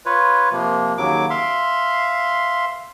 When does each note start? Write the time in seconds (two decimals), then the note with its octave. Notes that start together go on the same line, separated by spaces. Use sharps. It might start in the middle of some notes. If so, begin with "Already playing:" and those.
0.06 F4 B4 C#5
0.52 C3 F3 A#3
0.98 D#2 C#3 F#3 D6
1.30 E5 F5 C6